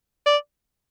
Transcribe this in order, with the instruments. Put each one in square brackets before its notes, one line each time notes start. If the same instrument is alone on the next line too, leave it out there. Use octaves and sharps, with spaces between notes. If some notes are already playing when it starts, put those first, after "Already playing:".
[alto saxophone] D5